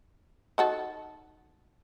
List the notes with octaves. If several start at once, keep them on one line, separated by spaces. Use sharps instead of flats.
D#4 F#4 A4